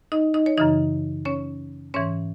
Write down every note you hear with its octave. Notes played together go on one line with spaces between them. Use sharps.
D#4 D#5
D#4 D#5
C#5
F#2 C#3 E3 D#4 D#5
C#4 C#5
G#2 E3 C#4 C#5